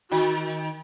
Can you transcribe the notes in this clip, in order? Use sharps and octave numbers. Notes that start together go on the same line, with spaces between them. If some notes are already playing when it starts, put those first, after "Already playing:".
D#3 F#4